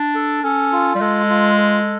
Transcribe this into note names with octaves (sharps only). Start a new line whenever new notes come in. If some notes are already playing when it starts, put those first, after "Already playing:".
Already playing: D4
A4
C#4 A4
F4
G3
G#3 A4
F4
A4